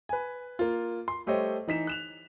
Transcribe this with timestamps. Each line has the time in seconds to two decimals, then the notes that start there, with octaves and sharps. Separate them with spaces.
0.09 B4 G#5
0.59 A#3 F4
1.08 C6
1.26 G3 A3 G4 C5 C#5 D#5
1.68 E3 D#4 B6 E7
1.87 F#6 E7 F7